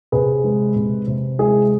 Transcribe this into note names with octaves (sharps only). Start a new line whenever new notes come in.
C3 G#4 B4
G#3
C3
C3
G#3 E4 G#4